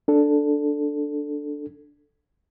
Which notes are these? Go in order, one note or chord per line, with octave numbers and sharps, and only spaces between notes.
D4 A4